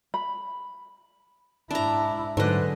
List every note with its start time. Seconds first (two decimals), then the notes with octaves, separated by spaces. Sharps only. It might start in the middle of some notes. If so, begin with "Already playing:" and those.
0.14 B5
1.71 G#2 D4 E4 A#5
2.37 G#2 D3 F#3 G#3 D4 B4 C5 D#5